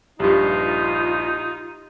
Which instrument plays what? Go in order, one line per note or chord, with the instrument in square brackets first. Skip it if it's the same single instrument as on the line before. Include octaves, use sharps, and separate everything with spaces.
[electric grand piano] A#1 G2 [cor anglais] D#4 [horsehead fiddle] F4 [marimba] G4